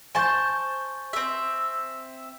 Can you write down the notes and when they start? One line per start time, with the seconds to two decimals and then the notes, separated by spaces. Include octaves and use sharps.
0.15 C5 G#5 A5 C#6 G6
1.13 C4 E5